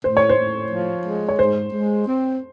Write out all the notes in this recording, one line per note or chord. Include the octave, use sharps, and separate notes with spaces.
A2 C5
C#5
C5
A2
F3
G#3
C#5
G#2 C5
G#3
C4